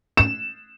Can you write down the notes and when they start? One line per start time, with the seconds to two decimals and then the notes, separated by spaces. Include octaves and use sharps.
0.17 E7